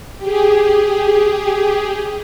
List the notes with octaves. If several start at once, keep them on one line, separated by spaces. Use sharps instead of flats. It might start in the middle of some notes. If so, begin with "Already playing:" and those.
G4 G#4